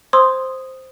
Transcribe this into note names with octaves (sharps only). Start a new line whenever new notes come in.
C5 C6 D#6 E6 G#6